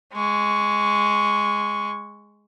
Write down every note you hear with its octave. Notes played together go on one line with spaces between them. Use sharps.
G#3 C#6